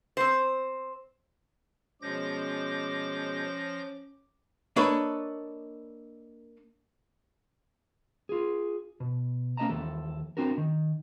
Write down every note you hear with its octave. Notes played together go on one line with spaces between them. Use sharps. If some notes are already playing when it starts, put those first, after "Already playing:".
C4 C5
B2 F3 G#3 C#4 D6 G6 A#6
A#3 D4 A4 B4 C#5 D#5
F4 G#4
B2
A#3 C#4 B4 D#5 A5 A#5
D#2 E3 A4
C4 D4 F#4 A#4
D#3